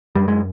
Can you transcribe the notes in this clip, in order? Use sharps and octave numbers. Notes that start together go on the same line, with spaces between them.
F#2 G3
G#3